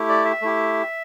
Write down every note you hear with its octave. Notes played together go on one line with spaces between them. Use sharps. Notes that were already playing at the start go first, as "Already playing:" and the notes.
Already playing: A3 E4 G4
D5
E5
A3 E4 G4